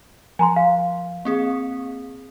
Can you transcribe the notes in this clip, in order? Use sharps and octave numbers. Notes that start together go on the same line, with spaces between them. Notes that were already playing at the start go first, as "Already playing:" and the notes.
F3 G#5 A#5 C6
F5
A#3 C4 G#4